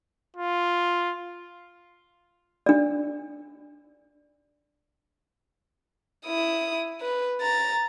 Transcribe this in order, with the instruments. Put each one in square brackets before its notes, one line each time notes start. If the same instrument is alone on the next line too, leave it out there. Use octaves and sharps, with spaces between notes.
[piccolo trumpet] F4
[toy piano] D4 D5
[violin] E4 D#6
B4
A#5 A6